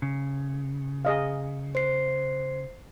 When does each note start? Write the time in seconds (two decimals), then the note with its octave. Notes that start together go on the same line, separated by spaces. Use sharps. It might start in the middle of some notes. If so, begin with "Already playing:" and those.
0.02 C#3
1.05 G#4 D#5 F5
1.75 C5 C7